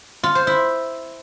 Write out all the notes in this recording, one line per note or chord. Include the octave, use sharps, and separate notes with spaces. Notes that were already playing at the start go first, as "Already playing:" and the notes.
F4
C5
E4